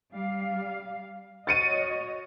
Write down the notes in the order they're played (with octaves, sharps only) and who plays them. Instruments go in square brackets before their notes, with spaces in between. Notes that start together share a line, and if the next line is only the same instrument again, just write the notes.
[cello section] G3 F5
[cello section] F#4 C#5 D#5 [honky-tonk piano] A6 C#7 D#7